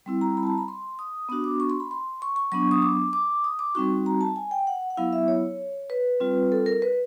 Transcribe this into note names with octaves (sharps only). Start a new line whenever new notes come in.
G3 C4 E4
A#5
B5
A5
A#5
B5
C6
D#6
B3 D4 F#4 D#6
D6
C#6
C6
B5
C6
C#6
C#6
F#3 B3 D4 C#6
D#6
D6
D6
D#6
D6
G3 C4 D#4 F#4 C#6
A#5
A5
G#5
G5
F#5
F#5
F#3 B3 E4 F5
E5
C#5
B4
G3 C4 F4
A4
A#4
B4